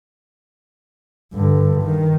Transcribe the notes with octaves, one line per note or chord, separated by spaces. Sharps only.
G2 D3
D#3